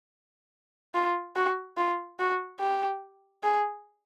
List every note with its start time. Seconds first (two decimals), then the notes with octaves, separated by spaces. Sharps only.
0.94 F4
1.35 F#4
1.77 F4
2.19 F#4
2.60 G4
3.43 G#4